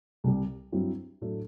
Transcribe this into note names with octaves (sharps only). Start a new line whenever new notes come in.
C2 C3 G3
G2 F#3 C4 E4
A2 F#3 A3 D4